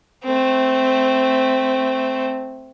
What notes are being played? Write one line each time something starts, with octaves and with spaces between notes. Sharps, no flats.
A3 C4